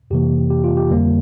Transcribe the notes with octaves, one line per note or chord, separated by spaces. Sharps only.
F2 C3 E3 A#3 G4
G4
F4
G4
F2 D3 G3 A#3